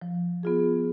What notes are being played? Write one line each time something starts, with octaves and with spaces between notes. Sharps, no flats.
F3
B3 F4 G#4